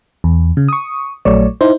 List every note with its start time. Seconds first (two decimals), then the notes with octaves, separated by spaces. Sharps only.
0.24 E2
0.57 C#3
0.68 C#6 D#6
1.25 A#1 F#3 A3 C#5 D5
1.61 D#4 E4 C5